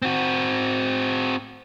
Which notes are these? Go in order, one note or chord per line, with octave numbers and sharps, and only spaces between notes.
C4 F#4